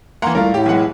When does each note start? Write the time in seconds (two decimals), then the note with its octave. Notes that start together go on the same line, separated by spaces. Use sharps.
0.22 E3 A#3 F#5 A#5 C6
0.35 C2 E3 A3 F4 A#4
0.54 A2 G4
0.66 B1 E3 G#3 F#5